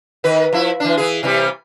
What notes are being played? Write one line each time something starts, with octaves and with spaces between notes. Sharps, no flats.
D#3 B4
F3 E4
E3 D4
E3 G#4
C3 E3 G3